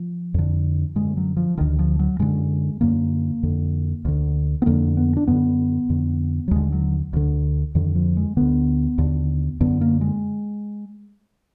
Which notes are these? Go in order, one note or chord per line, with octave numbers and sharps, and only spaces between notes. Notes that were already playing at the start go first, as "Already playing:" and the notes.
Already playing: F3
F2 D3
F#2 D3 G#3
F#3
F3
D2 D3 D#3
F3
F#3
F#2 D3 G#3
F#2 D3 A#3
F2 D3
D2 D3
B3
F2 D3 A#3
B3
D4
F#2 D3 B3
F2 D3
F#3
D#2 D3 G#3
F#3
D2 D3
F2 D3 D#3
F3
G#3
D2 D3 B3
D#2 D3
F#2 D3 B3
A#3
G#3